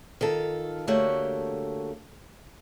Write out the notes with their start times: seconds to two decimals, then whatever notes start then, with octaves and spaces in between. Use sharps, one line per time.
0.21 D#3 F4 A4
0.87 D3 A3 A#3 F#4 G4 C#5